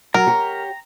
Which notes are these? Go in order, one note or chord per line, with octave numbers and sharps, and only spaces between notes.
F#3 A#4 A#5
G4 C#5